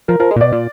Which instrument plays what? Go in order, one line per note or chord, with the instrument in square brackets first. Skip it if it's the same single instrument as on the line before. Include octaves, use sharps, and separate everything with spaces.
[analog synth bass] F3 [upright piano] A#4
[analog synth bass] F3 [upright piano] A#4
[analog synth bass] G#3
A#2
[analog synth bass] B2 [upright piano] D5
[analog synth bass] A#2